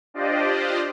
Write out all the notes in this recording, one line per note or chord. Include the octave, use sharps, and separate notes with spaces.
D4 F4 G4 C5 D5 D#5